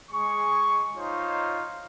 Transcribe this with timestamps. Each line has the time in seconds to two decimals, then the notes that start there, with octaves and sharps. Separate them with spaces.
0.11 G#3 G#4 C#6
0.96 D#4 F4 C5 C#5 F5